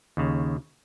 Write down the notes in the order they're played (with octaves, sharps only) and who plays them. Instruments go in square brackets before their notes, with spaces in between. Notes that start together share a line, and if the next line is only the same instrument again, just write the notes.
[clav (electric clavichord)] D#2 C#3